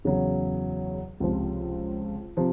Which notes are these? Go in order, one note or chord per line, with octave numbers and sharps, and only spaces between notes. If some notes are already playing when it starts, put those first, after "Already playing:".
E2 C#3 F#3
C#2 C3 F3
C3 F3